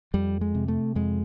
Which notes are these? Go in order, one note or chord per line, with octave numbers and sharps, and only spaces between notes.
F2 G3
G#3
C3
A3
F2 G#3